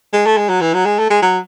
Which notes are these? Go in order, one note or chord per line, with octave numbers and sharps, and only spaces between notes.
G#3
A3
G#3
F#3
E3
F#3
G#3
A3
G#3
F#3